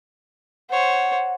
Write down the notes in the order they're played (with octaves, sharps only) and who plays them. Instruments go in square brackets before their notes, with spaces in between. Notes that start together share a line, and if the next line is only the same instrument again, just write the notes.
[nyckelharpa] C5 C#5 [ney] F#5